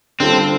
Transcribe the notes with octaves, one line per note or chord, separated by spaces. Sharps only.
D3 G3 C4 F4 A4